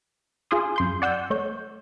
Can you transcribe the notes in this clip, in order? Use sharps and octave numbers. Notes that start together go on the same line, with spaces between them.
F4 G#4 G#5 C6 D#6
F#2 C6 G6
D5 F#5 E6 G6
A3 C#5 G6